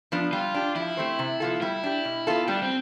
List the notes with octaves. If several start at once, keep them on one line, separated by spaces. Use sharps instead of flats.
F3 B3 D4
G3 F4
D4 G4
F3 E4
A3 C4 G4 C5
C3
F3 B3 F4 A4
G3 E4
D4 G4
B2
B3 F4 A4
G3 D4
C4